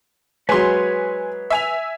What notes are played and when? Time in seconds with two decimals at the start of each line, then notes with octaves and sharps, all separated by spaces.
0.49 F#3 G#3 B4 C#5 G#5 C6
1.50 E5 G#5 F7